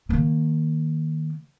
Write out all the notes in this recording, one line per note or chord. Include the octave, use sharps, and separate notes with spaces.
D#3 A#3